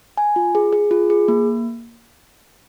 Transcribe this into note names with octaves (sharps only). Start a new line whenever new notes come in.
G#5
F4
G#4
G#4
F4
G#4
A#3